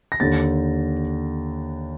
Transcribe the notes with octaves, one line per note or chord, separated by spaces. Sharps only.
A#6
D#2 D3 A6